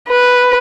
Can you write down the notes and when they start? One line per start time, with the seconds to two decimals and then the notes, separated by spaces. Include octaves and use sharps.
0.09 B4